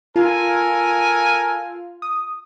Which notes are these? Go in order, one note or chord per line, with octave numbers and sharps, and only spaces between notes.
F4 A4 A#4 G#5
D#6